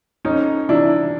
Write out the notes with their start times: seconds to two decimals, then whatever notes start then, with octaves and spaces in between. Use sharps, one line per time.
0.25 F2 C#4 D#4
0.69 C3 E3 D4 E4